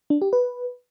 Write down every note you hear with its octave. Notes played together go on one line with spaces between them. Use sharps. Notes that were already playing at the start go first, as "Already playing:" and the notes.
D4
G4
B4